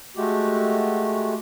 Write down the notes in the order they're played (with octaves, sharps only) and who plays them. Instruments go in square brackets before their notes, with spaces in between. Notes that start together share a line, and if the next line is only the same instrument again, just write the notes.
[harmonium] G#3 A3 F#4 G4